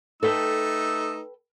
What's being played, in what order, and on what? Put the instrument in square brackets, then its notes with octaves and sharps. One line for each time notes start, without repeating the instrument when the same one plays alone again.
[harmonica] A3 D#4 E6 [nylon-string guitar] A4 B4 G5